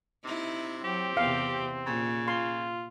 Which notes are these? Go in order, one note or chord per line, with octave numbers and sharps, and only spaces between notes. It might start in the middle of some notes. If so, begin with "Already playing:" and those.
C3 D#4 E4
F#3 C4 G4
E2 C3 F5
A#2 C#3
F4 C6